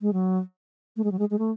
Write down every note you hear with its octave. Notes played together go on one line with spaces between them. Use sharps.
G#3
F#3
A3
G#3
F#3
G#3
G#3
A3